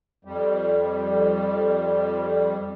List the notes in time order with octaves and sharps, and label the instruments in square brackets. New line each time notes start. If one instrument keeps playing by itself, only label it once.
[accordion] F2 G3